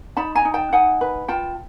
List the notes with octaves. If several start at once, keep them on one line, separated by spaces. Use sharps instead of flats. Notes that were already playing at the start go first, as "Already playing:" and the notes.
D#4 A5 B5
G#5 A#5
D#4
G5 A5
D#4 F#5 G#5
B4
F4 G5 A5